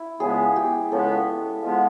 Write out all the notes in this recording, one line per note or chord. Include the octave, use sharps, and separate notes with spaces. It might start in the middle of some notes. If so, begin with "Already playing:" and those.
Already playing: E4
C#2 C#3 F3 G#3 B3 G#4
G4
C#2 C#3 F3 G#3 B3 A4
F3 G#3 B3